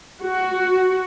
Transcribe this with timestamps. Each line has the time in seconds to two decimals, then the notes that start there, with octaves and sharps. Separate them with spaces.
0.22 F#4